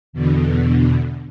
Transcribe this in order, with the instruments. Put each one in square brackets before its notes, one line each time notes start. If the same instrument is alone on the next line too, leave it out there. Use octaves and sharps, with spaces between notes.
[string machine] E2 B2 D3